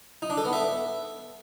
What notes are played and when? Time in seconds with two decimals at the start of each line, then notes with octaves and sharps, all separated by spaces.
0.22 D#4
0.30 D4
0.38 A4
0.45 B3
0.53 E5